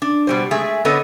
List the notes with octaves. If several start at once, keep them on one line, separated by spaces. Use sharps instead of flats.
D4
B2 G3 C5
G#3 A3 G#4 E5
D3 B3 A4 B4 C#5 D#5